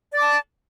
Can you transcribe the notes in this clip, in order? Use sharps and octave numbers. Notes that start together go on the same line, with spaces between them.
D5 A5 D6